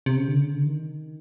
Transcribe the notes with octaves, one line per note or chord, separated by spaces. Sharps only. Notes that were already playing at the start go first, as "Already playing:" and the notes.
C3
C#3
D3
C#3
D3
D#3